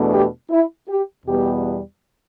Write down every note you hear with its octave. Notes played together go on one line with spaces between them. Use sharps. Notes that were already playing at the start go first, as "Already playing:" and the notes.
Already playing: E2 B2 A3 D4
G4
E4
G4
E2 B2 G3 B3 G4